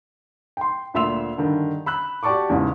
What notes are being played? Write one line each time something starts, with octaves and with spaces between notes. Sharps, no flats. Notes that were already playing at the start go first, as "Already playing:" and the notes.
G5 C6
D2 A#2 E5 C6 E6 F7
G2 D3 D#3
B5 E6 F#6
F#4 G4 D5 A5 C#6 D6
E2 G#2 C#3